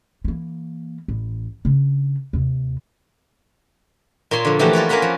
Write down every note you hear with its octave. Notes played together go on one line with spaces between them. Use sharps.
E3 A#3
A1
C#3 D4
D#2 C3
A#2 A#3 C#5 C6
D3 F3
E3 F3 A3 A#3 F#4 G4
F4 F#4 C#5 D5
A#3 C#4 A#4 C#5 F#5 B5
F3